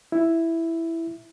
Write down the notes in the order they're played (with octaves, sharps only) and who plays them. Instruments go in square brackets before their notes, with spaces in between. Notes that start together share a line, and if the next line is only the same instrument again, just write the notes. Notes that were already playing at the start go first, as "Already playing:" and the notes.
[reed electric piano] E4